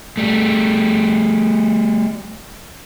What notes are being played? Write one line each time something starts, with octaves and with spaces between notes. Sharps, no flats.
G3 A3